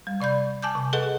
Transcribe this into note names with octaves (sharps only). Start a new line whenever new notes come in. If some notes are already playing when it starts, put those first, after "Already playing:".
G3
C3 D5 B5 G6
G#5 A5 D6 G6
C3
G#4 A4 B4 D#5 F#5